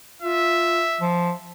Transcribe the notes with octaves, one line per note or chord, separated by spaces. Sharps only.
F4 E5
F3